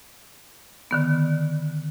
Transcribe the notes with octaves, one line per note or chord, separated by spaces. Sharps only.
D3 D#3 B3